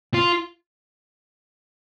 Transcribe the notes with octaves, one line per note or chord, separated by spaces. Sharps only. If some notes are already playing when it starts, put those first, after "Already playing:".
F4